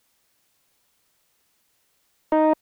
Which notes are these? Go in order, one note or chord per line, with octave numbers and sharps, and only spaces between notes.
D#4